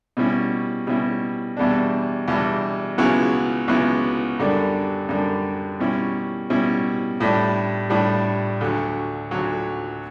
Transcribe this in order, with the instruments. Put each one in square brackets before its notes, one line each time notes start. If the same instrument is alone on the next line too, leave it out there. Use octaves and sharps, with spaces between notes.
[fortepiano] B2 G3 C#4 E4
B2 G3 C#4 E4
E2 B2 G3 D4
E2 B2 G3 D4
C#2 C#3 F#3 B3 E4
C#2 C#3 F#3 B3 E4
F#2 D3 G3 D4
F#2 D3 G3 D4
B2 G3 C#4 E4
B2 G3 C#4 E4
A2 G3 D4
A2 G3 D4
D2 D3 F#3
D2 D3 F#3